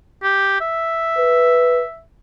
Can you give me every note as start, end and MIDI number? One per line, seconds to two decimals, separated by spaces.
0.23 0.58 67
0.61 2.01 76
1.17 1.82 71